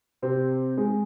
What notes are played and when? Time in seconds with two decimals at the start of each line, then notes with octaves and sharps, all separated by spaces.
0.22 C3 C4
0.77 G#3